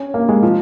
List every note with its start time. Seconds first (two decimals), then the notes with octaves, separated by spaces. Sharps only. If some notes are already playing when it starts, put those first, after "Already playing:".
Already playing: C#4
0.14 A#3
0.29 G#3
0.43 F3